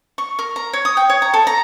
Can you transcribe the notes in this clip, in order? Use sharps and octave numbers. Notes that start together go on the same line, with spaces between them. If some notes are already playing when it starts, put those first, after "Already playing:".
C#6
A#4
A#5
C#5
D#6
G5
C#5
A#5
A4
A#5